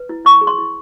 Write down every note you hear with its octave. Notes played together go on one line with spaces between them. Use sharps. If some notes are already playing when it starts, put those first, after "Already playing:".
Already playing: B4
E4
E4 C#6
G#4
C6
E4